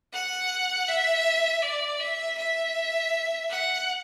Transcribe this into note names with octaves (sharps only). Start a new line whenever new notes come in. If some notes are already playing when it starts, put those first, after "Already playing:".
F#5
E5
D5
E5
E5
F#5